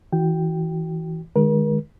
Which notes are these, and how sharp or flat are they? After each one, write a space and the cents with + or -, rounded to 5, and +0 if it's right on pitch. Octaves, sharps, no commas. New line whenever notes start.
E3 -20 F#4 +20 G5 +0
D#3 -35 G#3 +0 A#4 +40